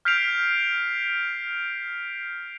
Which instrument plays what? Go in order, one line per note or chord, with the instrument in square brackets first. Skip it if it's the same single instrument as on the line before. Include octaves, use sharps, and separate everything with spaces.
[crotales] F6 G6 B6 C7 D7 F7